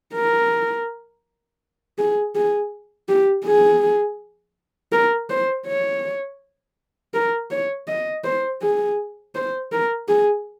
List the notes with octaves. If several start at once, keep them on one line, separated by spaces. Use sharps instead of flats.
A#4
G#4
G#4
G4
G#4
A#4
C5
C#5
A#4
C#5
D#5
C5
G#4
C5
A#4
G#4